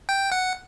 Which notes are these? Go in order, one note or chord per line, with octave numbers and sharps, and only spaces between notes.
G5
F#5